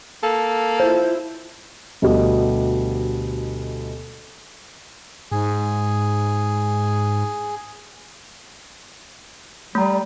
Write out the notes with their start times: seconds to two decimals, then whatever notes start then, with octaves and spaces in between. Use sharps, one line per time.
0.23 A#3 A4
0.80 E4 F4 C5
2.02 D2 B2 G3 G4 D#5
5.32 G#2 G#4
9.75 G3 A3 A#5